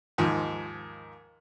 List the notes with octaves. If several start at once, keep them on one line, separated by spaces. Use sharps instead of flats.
D#2 G#2 F3